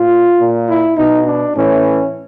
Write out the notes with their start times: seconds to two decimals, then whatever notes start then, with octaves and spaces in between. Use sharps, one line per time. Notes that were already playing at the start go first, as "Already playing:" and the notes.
Already playing: A#2 F4
0.38 A#2
0.67 E4
0.96 B2 D#4
1.25 D4
1.54 A2 E3 C#4